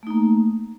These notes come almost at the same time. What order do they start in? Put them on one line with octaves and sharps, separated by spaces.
A3 D#4 A#3